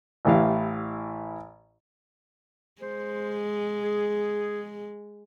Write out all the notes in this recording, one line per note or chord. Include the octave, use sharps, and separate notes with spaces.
A1 A2 E3 G4 F5
G#3 C5
G#4